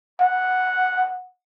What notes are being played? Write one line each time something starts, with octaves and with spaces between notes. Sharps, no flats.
F#5